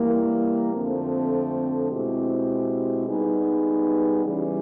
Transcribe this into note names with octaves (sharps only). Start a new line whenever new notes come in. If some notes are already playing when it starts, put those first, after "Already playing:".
Already playing: E3 G3 A#3
F2 D3 F3 A3 C4
B2 G#3 C4 E4 G4
G3 B3 D#4 G#4 B4
C#3 E3 G3